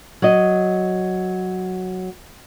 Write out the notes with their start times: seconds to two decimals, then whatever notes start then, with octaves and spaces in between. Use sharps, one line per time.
0.22 F#3 D#5